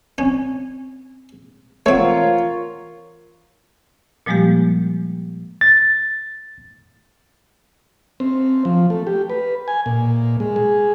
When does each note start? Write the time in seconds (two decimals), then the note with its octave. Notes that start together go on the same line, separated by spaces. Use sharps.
0.18 C4 C#4
1.86 E3 A3 C4 F4 A#4 C#5 F#5
4.26 A#2 F3 G3 G#3 A#3 G4
5.61 A6
8.20 C4
8.65 F3
8.90 A3
9.07 G4
9.30 B4
9.68 G#5
9.86 A#2
10.40 G#3
10.56 G#4